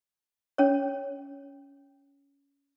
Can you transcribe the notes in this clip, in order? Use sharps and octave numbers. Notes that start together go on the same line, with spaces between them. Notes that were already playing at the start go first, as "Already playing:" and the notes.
C#4 C#5